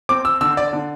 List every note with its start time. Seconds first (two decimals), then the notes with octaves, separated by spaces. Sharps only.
0.09 C4 D6
0.25 E6
0.41 D3 E6
0.57 D5
0.73 D3